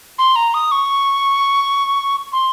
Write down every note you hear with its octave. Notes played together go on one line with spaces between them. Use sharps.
C6
A#5
D#6
C#6
C6